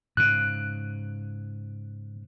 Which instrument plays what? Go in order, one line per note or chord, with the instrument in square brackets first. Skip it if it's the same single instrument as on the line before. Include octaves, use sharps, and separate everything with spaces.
[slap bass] G#2 C#3 [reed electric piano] F#6